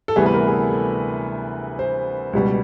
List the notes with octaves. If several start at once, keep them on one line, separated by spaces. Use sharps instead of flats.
A4
D2 C3 E3 G3 B3 G#4
B4
A#4
G#4
A4
A4
C5
C#2 B2 G3